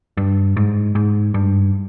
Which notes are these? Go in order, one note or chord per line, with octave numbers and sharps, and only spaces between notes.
G2
G#2
G#2
G2